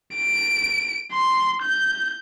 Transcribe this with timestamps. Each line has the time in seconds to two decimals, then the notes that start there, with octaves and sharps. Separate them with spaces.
0.15 D7
1.13 C6
1.62 G6